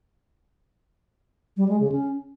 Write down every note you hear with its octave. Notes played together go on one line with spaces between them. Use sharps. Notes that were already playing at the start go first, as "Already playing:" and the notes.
G3
G#3
C#3
C#4